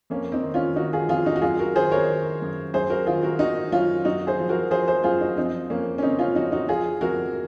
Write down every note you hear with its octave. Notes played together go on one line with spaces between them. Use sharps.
F2 A#3 C#4
C4 D#4
D#3
C#4 F4
D#3 D#4 F#4
F4 G#4
F2 F4 G#4
D#4 F#4
F#4
F#2 F4 G#4
F#4 A#4
D#3 G#4 C5
A#4 C#5
D#3
F#2
F#2 G#4 C5
F#4 A#4
D#3 F4 G#4
F#4 A#4
D#3 D#4 F#4
F#2 C#4 F4
F#2 D#4 F#4
G#4 C5
F3
F#4 A#4
F3 G#4 C5
G#4 C5
F#2 F4 G#4
D#4 F#4
F3 C4 D#4
F2 A#3 C#4
C#4
C#3 C4 D#4
C#4 F4
F2 D#4 F#4
D#4 F#4
F3 F4 G#4
F2 F#4 A#4